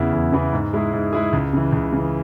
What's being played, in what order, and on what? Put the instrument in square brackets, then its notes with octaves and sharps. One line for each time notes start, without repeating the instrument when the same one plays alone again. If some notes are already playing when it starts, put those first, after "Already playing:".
Already playing: [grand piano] E2 C#3 E3 B3 E4
E2
C#3 E3 B3 E4
G#2
G#3 E4 G#4
G#2
G#3 E4 G#4
C#2
C#3 E3
C#2
C#3 E3